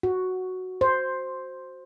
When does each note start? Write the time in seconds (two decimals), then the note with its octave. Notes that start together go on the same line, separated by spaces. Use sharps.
0.03 F#4
0.81 C5